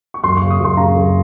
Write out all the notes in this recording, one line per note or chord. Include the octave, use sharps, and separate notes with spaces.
C#6
F#2 C6
C#3 C#6
D#6
F#2 C6
C#3 A#5
F#2